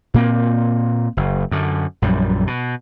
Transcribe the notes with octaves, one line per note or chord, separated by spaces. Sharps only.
A#2 A#3 C4
F#1
F#2 D3
A#1 F#2 G3
B2